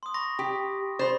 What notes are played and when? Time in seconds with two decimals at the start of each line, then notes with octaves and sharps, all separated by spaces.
0.03 C6 D#6
0.14 B5 C#6 A#6
0.39 G4
0.99 C5 B5 A6